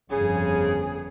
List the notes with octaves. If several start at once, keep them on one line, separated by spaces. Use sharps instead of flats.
G1 F2 C#3 G#4